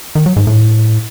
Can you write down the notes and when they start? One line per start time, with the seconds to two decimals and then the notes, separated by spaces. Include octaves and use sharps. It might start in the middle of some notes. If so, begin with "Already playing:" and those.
0.15 D#3
0.26 F#3
0.36 G#2
0.47 A2